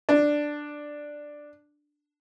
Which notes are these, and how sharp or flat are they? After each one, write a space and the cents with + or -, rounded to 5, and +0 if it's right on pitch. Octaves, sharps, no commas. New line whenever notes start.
D4 +5